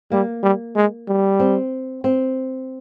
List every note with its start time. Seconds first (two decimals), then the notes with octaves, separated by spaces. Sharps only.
0.12 G3 A#3
0.43 G3
0.76 G#3
1.08 G3
1.40 C4
2.04 C4